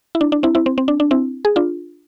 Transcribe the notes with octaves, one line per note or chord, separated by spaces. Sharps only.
E4
D4
D4
C4 E4
C4 E4
C4
C4
D4
D4
C4 E4
G#4
D4 F4